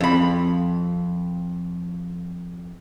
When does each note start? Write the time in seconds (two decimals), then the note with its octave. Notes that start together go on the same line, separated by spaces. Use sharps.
0.01 F2 B5